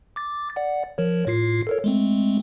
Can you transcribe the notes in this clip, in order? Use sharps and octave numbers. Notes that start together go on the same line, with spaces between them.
D6 A6
D5 F#5
F3 A#4 C#5
A2 F4 C7
A4 A#4 C#5
G#3 A3 C4